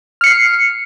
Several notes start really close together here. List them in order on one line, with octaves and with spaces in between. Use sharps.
F6 C#7 C7